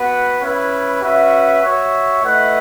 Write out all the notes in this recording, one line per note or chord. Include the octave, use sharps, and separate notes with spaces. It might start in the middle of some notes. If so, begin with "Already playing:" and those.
Already playing: B3 F#4 B4 F#5
C#4 E4 B4
C#4 F#4 B4 E5
F#4 C#5 E5
A3 E4 B4 D#5 F#5